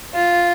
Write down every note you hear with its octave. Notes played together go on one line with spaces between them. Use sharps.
F4